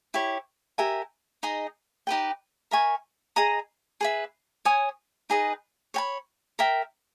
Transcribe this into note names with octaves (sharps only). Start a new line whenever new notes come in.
E4 G4 C#5
G4 A#4 E5 G#5
D#4 G#4 D#5
D#4 G4 B4 G5
A#4 E5 G#5 C#6
G#4 D#5 A#5
G#4 B4 E5
C#5 G#5 D#6
D#4 G#4 B4 D#5
C#5 G5 B5
A#4 E5 G5